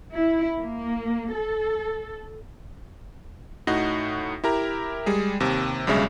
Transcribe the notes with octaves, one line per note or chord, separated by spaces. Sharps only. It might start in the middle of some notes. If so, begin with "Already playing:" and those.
E4
A#3
A4
A2 D#4 F#4 F#5 A#6
E4 G4 A#4 A#5
G3 G#3 G#4
D#2 C3
B1 G2 C#3 G#3 E5